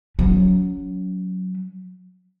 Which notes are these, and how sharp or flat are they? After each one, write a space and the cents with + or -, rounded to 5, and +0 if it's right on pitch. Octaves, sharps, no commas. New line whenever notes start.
F#3 -5 C#4 +25